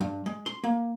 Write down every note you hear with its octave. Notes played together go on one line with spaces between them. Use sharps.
G2
G#3
C6
A#3